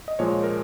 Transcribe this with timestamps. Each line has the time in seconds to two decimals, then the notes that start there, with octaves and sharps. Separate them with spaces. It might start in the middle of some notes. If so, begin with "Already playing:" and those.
0.08 D#5
0.19 A#2 F3 G#3 C#5
0.43 A#4